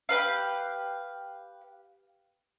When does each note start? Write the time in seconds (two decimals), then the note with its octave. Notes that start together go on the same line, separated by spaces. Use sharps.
0.09 G4 B4 F5